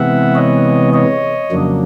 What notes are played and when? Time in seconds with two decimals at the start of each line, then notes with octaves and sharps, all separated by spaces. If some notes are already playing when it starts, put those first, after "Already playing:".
Already playing: C3 E3 G#3 B3 E5 F#5
0.35 C#5 D#5
0.93 C#5 D#5
1.51 F2 C#3 F#3 A#3 D4